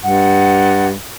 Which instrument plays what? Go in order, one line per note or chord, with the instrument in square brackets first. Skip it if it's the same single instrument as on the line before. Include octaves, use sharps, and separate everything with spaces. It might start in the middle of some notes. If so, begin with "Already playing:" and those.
[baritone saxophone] G2 [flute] F#5